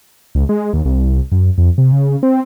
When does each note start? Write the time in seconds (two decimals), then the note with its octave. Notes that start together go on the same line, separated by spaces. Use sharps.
0.35 C#2
0.49 G#3
0.73 D#2
0.85 C2
1.32 F#2
1.58 F2
1.78 C3
1.92 C#3
2.23 C4